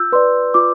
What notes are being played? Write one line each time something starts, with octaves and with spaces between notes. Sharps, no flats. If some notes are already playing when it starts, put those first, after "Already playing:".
Already playing: F4 E6 G6
B4 D5 C6
F4 D6